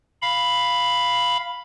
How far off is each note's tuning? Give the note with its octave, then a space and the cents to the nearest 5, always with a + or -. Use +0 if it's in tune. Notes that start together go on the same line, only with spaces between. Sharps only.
F5 +0 B5 +0